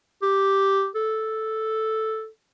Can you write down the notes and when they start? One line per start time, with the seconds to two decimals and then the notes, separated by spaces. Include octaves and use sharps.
0.22 G4
0.95 A4